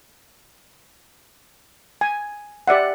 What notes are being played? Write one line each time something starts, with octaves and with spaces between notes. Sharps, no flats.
G#5
G4 D5 E5 F#5